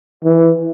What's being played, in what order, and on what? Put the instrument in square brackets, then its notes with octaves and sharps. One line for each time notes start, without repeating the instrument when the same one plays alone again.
[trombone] E3